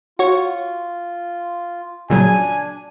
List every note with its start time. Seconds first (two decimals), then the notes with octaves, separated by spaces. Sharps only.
0.19 F4 F#4 C#5
2.10 A#2 C#3 F#3 D4 G#5